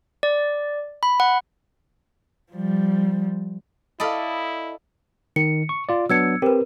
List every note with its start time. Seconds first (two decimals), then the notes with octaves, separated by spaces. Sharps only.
0.23 D5
1.03 B5
1.20 F#5
2.52 F3 G3
4.00 E4 A4 D5 D#5 F5 B5
5.36 D#3 C#7
5.69 C#6
5.89 F4 D5
6.10 F#3 B3 D4 E6 G#6 C#7
6.42 C4 G4 A#4 B4